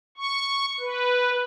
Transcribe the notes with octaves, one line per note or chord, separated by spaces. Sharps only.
C#6
B4